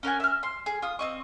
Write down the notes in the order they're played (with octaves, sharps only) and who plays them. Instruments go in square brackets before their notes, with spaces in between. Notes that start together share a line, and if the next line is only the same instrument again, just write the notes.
[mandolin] C#4 A#4 F#5 G#5
E5 F6
C6
G#4
F4 D#6
C4 D#5 C#6